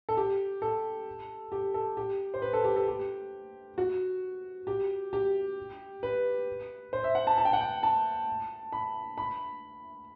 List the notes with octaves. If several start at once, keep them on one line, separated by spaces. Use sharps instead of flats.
A4
G4
A4
G4
A4
G4
C5
B4
A4
G4
A4
G4
F#4
G4
G4
B4
C5
E5
F#5
A5
A5
G5
F#5
G5
A5
B5
B5